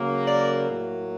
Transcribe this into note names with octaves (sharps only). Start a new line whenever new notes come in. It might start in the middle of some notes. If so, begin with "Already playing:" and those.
Already playing: C#3 F#3 A#3
D5
A2 F#3 A#3